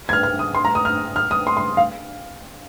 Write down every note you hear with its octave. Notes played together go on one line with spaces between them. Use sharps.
G#6
F6
F6
D#6
C6
A#5
D#6
F6
F6
D#6
C6
C6
F5